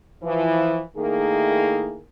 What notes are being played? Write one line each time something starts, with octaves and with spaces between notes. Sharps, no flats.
E3 F3
D#3 A3 A#3 E4 G#4